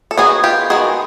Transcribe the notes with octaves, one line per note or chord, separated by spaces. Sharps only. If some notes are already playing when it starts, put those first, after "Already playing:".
A4
D#3 G#3 B3 F#4 G#4
F4 G4
D#3 G#3 B3 F#4 G#4